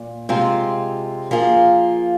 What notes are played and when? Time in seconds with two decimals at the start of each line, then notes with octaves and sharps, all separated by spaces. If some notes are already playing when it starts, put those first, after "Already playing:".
Already playing: A#2
0.29 C3 G#3 C4 F4
1.31 F3 A#3 F4 G#4